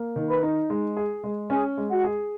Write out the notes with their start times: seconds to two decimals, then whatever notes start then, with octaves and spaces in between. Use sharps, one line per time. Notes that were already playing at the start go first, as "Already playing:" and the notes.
Already playing: A#3
0.16 D#3
0.29 B4 B5
0.43 D#4
0.70 G#3
0.97 G#4
1.24 G#3
1.50 C#4 G#4 G#5
1.77 G#3
1.91 F#4 F#5
2.04 G#4